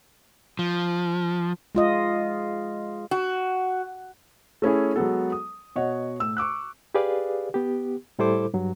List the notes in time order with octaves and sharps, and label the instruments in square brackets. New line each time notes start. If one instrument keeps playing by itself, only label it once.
[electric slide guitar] F3
[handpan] G#3 F4 D#5
[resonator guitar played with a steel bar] F#4
[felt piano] A3 C#4 E4 G#4
F#3 G#3 B3 A4
D#6
B2 C#5 D#5 F#5
A2 E6
C#6 D6 E6 F#6
[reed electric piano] G4 G#4 B4 D5 F5
B3 G4
A2 G3 E4 A4 C5 D6
G2 F#3